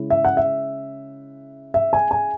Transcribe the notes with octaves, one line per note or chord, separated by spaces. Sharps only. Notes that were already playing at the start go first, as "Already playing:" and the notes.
Already playing: C#3 G#3 C#4 E4
E5
F#5
E5
E5
G#5
G#5